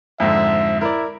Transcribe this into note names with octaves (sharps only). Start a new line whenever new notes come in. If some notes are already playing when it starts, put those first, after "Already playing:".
F2 G#2 D3 E5
E4 A#4 D5